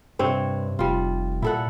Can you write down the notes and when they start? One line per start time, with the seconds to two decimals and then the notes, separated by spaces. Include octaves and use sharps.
0.19 G2 C3 C4 C#5
0.79 F1 G3 F4
1.42 A#2 E4 A4 F#5